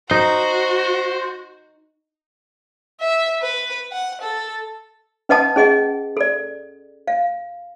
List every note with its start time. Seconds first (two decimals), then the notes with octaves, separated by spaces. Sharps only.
0.11 D#4 F#4 C5
3.01 E5
3.42 B4
3.92 F#5
4.22 A4
5.29 C#4 B4 D#5 F#5 A5 D#6
5.56 C#4 G#4 D#5 F#5
6.17 A4 D5
7.08 F5